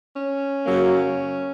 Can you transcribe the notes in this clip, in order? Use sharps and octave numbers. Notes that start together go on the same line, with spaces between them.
C#4
F#2 C#3 F#3 A#3